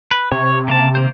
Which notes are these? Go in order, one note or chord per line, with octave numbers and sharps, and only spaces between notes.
B4
C3 C#5
C#3 A#3 A5
D#3 A#3 C5